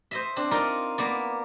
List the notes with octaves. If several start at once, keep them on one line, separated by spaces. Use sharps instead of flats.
C5 D#5 E5
C4 D4
D#4 F4 A#4 D5
A#3 B3 D5